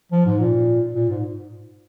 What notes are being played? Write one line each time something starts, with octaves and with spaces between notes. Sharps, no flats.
F3
G#2
A#2
A#2
G#2